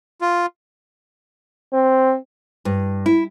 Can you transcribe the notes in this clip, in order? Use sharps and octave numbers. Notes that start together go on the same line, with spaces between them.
F4
C4
G2
E4